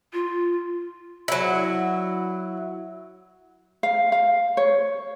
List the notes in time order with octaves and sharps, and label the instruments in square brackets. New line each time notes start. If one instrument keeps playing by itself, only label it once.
[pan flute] F4
[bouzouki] F#3 E4
[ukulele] F5
F5
C#5